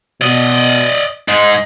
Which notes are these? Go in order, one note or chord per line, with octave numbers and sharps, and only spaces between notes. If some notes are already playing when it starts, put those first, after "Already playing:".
B2 D5 D#5
G#2 G#3 D#5